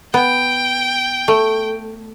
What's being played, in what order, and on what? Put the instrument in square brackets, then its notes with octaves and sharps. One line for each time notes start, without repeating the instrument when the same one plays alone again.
[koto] B3 [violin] G5
[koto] A3